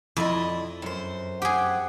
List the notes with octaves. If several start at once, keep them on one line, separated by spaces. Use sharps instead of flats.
F2 E4 D5 D#5
F#2 C5
G4 G#4 F#5